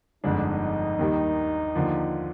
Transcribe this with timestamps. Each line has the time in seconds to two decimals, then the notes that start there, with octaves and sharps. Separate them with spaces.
0.24 G1 F2 D3 G#3 D4 D#4
0.99 D#2 D#3 G3
1.76 D#2 D3 F3